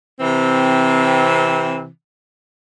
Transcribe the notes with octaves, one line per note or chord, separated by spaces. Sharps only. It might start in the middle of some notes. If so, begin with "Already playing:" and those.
C3 E3 C4